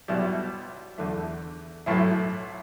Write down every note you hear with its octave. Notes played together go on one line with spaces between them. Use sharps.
B1 B2 G3 E4
E2 D3 A3
B1 A2 F#3 A3 E4